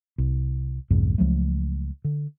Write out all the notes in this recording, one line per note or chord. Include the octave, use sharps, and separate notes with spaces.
C2
B1 F2 G#2 D3
C#2 F3 F#3 A3
D3